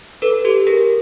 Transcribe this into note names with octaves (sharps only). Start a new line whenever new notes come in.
A4 B4
G4 A4
G#4 A#4